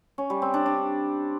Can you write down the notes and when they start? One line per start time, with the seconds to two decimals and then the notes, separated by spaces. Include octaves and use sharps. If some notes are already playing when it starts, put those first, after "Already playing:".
0.18 C#4
0.30 G3
0.42 C4
0.54 D4
0.66 D4